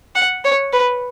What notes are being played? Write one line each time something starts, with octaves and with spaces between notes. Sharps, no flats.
F#5
C#5
B4